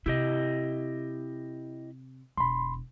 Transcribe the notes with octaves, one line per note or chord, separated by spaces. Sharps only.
C3 E4 G4 D#5
E1 B5 C6